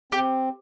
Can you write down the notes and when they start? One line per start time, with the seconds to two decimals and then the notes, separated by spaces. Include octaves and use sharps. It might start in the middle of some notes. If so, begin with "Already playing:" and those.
0.12 C4 G4